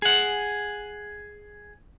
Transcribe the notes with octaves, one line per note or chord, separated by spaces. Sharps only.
G#4 F#5